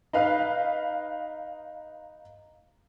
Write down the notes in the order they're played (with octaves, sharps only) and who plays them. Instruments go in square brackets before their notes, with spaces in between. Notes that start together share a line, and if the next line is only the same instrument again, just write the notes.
[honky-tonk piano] D#4 B4 F5